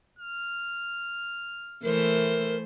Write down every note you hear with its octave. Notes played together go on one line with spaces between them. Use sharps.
F6
E3 A3 A#4 C5